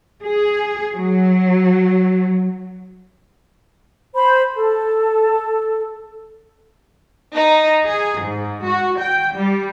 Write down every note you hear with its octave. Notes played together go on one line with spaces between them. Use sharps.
G#4
F#3
C5 B5
A4
D#4
G#4
G#2
F#4
G5
G3